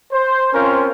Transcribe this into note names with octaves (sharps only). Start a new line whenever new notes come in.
C5
C4 C#4 F4 A#4 C5